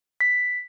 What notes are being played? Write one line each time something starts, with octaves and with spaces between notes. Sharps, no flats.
B6